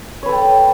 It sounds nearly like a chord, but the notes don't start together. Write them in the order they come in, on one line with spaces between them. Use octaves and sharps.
C#5 B4 A4 G5